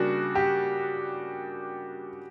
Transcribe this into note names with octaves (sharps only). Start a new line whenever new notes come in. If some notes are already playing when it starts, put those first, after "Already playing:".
Already playing: C#3 G3 A#3 D4 F#4
G4